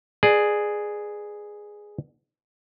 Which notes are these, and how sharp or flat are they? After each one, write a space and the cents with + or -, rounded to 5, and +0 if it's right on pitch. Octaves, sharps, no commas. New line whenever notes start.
G#4 +0 B4 +0 D5 +25